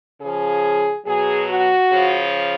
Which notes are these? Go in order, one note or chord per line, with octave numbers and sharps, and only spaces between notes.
C#3 F3 G#4
B2 F#3 G#4
F#4
C#3 F3